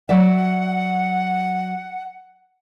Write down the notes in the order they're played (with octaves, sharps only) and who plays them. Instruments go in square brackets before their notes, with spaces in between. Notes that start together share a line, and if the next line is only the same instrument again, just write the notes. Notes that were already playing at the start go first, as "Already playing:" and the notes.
[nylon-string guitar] F#3 D5 E5 [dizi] F#5